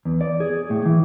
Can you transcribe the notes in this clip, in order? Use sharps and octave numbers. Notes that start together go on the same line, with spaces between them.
E2
D5
G#4
A2
E3